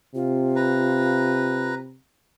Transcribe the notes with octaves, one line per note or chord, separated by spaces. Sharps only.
C3 F4
B4 A#5